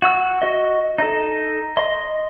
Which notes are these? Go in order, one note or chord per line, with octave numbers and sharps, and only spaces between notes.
F#4 E6
F#4 D#5
D#4 A4
D#5 C6